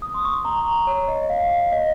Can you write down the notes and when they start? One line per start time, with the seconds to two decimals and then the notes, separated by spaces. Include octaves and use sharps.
0.02 D#6
0.14 C6
0.24 C#6
0.45 A#5
0.87 C#5
1.08 D#5
1.29 F5
1.72 D#5